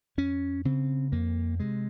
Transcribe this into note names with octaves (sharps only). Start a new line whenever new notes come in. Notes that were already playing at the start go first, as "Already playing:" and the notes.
F2 C#4
C#3 C4
F2 A#3
C3 G#3